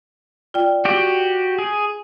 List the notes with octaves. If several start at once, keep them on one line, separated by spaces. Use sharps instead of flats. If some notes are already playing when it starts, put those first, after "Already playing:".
F4 D5 G5
F#4 G4
G#4